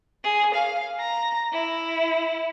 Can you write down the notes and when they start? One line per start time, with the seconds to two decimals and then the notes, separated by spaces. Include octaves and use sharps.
0.23 G#4
0.53 F5
0.99 A#5
1.52 E4